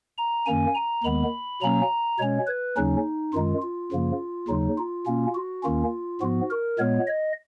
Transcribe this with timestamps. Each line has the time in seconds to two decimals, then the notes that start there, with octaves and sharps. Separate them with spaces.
0.18 A#5
0.46 F#2 D#3 A#3 C#4 G#5
0.75 A#5
1.04 D#2 D#3 G#3 B3 B5
1.61 B2 F#3 A#3 C#4 A#5
2.19 B2 G#3 C#4 C#5
2.47 B4
2.76 D#2 C#3 F#3 C#4 D#4
3.33 F#2 D#3 G#3 F4
3.62 F4
3.92 F#2 C#3 F3 A#3
4.48 D#2 C#3 F#3 D#4
4.78 F4
5.06 B2 A#3 C#4
5.35 F#4
5.63 D#2 D#3 A#3 C#4 F4
6.21 G#2 F3 B3 F#4
6.50 A#4
6.79 A#2 G#3 B3 C#5
7.07 D#5